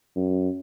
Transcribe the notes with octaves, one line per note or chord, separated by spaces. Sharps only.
F#2